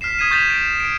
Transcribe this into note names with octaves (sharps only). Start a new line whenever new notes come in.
F6 B6 C7 E7
D#6 G#6 B6 D#7
C#6 G6 A6 B6 E7 F7
D7 E7
D7